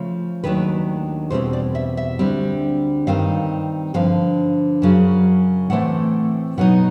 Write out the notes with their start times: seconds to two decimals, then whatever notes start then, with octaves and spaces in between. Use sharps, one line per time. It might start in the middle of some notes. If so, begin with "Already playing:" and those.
Already playing: C#3 F3 A3
0.44 D#2 D#3 F#3 A3 D4 B4
1.30 E2 B2 G3 C4 E4 C5
1.53 D5
1.75 E5
1.97 E5
2.19 D2 D3 G3 C4
3.07 G2 D#3 G3 C4 D#4 F5
3.94 G2 D3 F3 F5
4.82 F#2 C#3 F#3
5.70 A2 E3 A3 C4 F#5
6.58 B2 F#3 B3 D#4 F#5